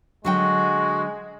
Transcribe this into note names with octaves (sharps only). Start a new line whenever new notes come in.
D3 F#3 G#3 F#4 G5